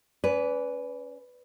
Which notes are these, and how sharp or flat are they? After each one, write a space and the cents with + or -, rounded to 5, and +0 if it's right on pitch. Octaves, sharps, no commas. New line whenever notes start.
C#4 +15 B4 +5 D5 -30